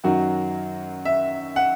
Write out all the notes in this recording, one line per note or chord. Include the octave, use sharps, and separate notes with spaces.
F#2 D#3 F#3 F#4
E5
F#5